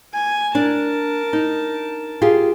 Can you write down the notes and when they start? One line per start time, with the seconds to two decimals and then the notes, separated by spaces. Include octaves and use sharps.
0.13 G#5
0.55 D4 A#4 A5
1.33 D#4
2.22 F4 G4 G#4